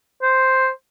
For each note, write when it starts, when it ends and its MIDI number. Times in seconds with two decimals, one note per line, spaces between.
0.22 0.70 72